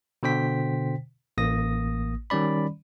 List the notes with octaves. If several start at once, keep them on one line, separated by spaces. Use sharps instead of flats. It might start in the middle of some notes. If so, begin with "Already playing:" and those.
B2 D3 C5 G5 B6
A1 A#3 D#6 A#6
D#3 G3 C#4 D5 B5